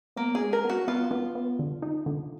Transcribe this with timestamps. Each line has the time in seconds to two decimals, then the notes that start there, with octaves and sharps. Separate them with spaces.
0.16 A#3 B3
0.35 G#4
0.41 G#3
0.53 A#4
0.65 B3 F#4
0.88 B3 F4
1.11 B3
1.35 B3
1.59 D3
1.82 D#4
2.06 D3